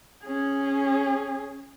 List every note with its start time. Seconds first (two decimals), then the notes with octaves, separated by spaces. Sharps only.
0.25 C#4 G#4